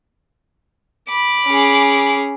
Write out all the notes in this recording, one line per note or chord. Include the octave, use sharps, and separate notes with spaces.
B5 D6
C#4 G#4